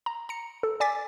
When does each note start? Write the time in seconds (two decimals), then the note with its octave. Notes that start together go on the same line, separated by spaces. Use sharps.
0.06 A#5
0.29 A#5 C#7
0.63 A4
0.80 D5 G#5 D6 A6 B6